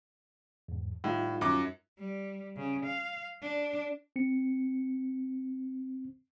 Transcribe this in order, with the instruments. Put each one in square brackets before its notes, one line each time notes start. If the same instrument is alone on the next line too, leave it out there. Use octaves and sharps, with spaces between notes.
[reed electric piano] E2 G#2
[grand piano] A2 [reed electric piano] G3 D#4 F4
[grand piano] F#2 D6
[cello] G3
C#3
F5
D4
[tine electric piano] C4 C#7